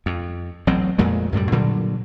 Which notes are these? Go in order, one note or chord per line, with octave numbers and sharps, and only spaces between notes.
F2
A1 F#3 C4
F2 A#2 G#3 A3
F#2 A2 C3 G3
A#2 D3 F#3 G3